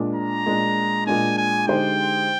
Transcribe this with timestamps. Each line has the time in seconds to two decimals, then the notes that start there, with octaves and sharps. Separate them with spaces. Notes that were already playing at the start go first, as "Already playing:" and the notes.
Already playing: A#2 G#3 D4
0.16 A#5
0.46 A#2 G#3 D4
1.07 A#2 G#3 D4 G#5
1.38 G#5
1.68 D3 G#3 D#4 G4 C5 G5